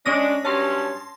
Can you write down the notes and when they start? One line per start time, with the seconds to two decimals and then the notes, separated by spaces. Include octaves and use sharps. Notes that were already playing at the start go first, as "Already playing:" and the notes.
0.06 G#3 C#4 D4 D#6 A#6
0.45 G2 F#3 C#4 A5 C6